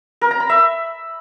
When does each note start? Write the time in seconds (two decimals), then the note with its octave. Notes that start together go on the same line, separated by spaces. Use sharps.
0.21 A#4
0.31 A#5
0.40 B5
0.49 E5